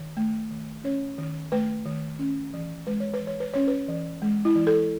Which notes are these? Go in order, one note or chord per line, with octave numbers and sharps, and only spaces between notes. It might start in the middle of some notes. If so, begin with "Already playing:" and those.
Already playing: D#3
A3
D#3
C#4 C#5
D#3
A3 B4
D#3
C#4
E3
G#3 B4
C#5
B4
E3
C#5
B4
C#4 C#5
B4
E3
G#3
E4
E3
A4